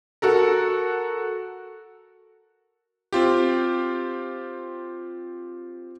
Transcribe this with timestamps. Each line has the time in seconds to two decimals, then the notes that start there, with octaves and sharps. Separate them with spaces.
0.22 F#4 A4 A#4
3.13 C4 F4 G4